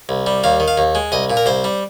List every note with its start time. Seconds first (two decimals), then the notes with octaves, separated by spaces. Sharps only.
0.09 C2
0.26 G3
0.44 D#2 F5
0.60 D#3
0.68 F5
0.78 D#2
0.95 G#3
1.12 C2 D#5
1.30 A#2
1.37 A#4
1.46 C2 C5
1.64 G3